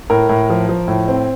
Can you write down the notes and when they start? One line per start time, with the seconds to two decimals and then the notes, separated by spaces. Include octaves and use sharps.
0.10 A2 A#4
0.29 A2
0.50 F3
0.69 F3
0.88 A2
1.08 C4